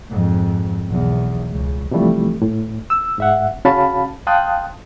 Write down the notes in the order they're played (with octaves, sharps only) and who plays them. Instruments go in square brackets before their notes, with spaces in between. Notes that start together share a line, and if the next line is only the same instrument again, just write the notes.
[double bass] F2 G#2
B1 E2
C#2
[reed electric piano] C3 E3 F3 G3 A3
A2
E6
G#2 E5 F#5
C#3 C#4 F#4 F5 A5 B5
F5 G5 A5 C6 D#6 F#6